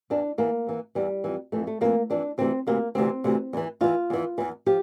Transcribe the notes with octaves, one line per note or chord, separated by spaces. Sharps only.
E2 E3 D4
E2 E3 A#3
E2 E3
E2 E3 G3
F2 E3
F2 E3 A3
A3
F2 E3 A#3
F2 E3 D4
D2 C3 E3 C4
D2 C3 E3 A#3
D2 C3 E3 C4
D2 C3 E3
E2 E3
E2 E3 F4
E2 E3
E2 E3
F3 G4